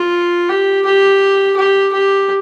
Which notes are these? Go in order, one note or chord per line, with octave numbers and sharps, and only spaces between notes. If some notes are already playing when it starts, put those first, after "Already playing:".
Already playing: F4
G4
G4
G4
G4